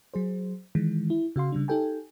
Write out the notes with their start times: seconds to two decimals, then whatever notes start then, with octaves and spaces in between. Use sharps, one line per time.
0.14 F#3 G#4 C5
0.75 D#3 E3 G#3
1.10 E4
1.36 C#3 F#4 F5 C6
1.52 C#3 G3 D4
1.68 D#4 G4 A4 G5 G#5